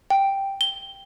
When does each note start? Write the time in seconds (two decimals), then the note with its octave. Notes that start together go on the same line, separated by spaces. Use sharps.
0.10 G5
0.61 G7